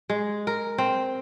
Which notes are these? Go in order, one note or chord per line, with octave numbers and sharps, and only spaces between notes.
G#3
A#4
C4